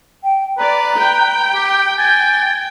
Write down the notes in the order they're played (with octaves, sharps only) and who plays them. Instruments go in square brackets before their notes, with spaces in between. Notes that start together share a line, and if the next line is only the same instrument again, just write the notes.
[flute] G5
[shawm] B4 [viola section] D5 [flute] A#5
[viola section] G5
[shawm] G4
[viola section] G5 [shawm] G#5 [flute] A6